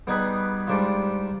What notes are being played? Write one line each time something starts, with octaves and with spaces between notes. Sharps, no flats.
G3 B3 D#4 G#4 B4
G#2 G3 D4 F4